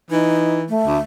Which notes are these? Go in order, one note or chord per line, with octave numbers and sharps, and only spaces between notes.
E3 D#4
A3
D2